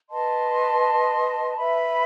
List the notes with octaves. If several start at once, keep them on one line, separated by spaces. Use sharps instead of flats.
B4 D#5 A5 C6
B4 E5 B5